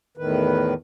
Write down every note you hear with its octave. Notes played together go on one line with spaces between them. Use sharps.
E2 A2 D#3 B4